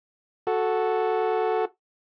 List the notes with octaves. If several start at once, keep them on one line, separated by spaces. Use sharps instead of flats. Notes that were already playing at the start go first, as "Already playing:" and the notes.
F#4 A4